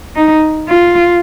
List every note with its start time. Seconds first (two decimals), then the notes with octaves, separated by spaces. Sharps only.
0.16 D#4
0.69 F4